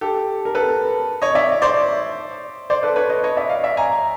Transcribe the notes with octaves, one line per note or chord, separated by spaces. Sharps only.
G4 A4
A#4
A4 B4
C#5 D#5
D5 E5
C5 D5
C5 D5
A4 B4
B4 C#5
C#5 D#5
C#5 D#5
D5 E5
D#5 F5
D5 E5
G#5 A#5